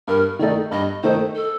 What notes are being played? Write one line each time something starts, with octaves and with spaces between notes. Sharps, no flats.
G2 A#4
D#3 A3 D#4 D5
G2 D#5
D#3 A3 D#4 C5
A4